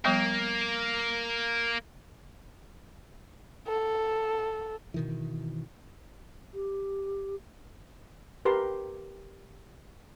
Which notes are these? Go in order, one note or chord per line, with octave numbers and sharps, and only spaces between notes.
F3 G3 A#3 B3
A4
B2 D#3 E3
G4
G4 A#4 B4 C6